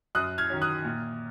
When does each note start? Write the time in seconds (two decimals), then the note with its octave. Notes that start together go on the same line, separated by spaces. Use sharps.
0.15 F#2 D#6 F#6
0.38 F6 G#6
0.50 D#3 F#3 C#4
0.62 D#6 F#6
0.85 A#2